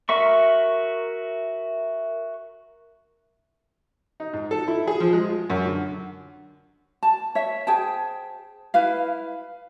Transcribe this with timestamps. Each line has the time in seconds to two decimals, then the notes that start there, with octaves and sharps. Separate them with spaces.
0.09 F#4 A#4 E5 C#6
4.20 D#4
4.33 G#2
4.51 A4
4.68 E4
4.87 G#4
5.00 F3
5.13 G#3
5.29 F4
5.50 F#2
5.65 D3
7.03 A5
7.35 C#5 E5
7.67 G#4 C5 G5 A5
8.74 E4 B4 F5